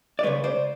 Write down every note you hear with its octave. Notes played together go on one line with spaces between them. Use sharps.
D5
C#3 F3 G#3 B4 C#5
C5 D5